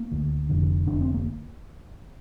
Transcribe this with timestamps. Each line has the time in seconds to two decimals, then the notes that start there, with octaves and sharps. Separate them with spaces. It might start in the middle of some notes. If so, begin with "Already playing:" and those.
Already playing: A#3
0.11 D2 D3
0.49 F1 F2 D3
0.87 F1 F2 D3 D4
1.01 C4
1.14 A#3